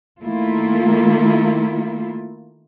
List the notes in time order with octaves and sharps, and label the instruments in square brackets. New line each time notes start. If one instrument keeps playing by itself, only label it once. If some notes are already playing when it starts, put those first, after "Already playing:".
[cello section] D#3 A3 A#3 E4 F4